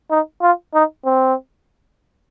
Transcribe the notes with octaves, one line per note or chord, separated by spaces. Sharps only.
D#4
F4
D#4
C4